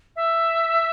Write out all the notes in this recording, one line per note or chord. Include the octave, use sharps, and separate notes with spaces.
E5